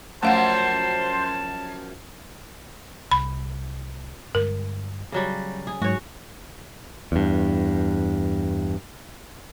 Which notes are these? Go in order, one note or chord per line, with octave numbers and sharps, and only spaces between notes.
F#2 F3 A3 C5 F5 F#5 A5
C2 B5
G2 D3 G#3 A#4
C#3 F#3 G3
G#4
G#2 F#3 F#4 C#5
E2 G2